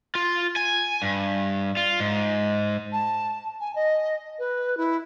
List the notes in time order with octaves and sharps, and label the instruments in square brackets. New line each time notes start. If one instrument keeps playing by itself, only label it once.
[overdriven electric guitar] F4
G#5
G2
F4
G#2
[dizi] A5
G#5
D#5
B4
E4